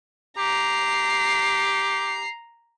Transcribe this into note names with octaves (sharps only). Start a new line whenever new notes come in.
G4 A#5 C7